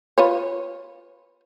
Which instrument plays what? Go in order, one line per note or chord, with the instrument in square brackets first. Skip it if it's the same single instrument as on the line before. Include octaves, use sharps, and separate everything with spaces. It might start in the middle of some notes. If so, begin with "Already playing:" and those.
[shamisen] F4 B4 C#5